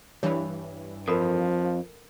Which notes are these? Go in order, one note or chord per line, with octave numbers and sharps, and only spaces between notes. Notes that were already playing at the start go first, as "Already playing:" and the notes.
G2 E3 C#5 B5
F2 F3 A4 A#4 B5